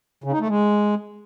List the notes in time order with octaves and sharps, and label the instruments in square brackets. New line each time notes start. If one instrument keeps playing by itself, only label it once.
[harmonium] C#3
D#4
A3
G#3